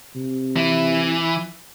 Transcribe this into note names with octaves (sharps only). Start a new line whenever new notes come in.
C3
E3